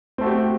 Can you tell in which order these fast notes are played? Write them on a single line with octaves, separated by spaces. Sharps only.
C4 A3 F#4 G4